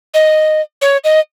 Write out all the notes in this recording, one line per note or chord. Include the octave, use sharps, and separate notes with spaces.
D#5
C#5
D#5